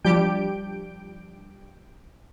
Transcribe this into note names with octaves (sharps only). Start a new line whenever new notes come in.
F3 G3 D4 G4 G6 D7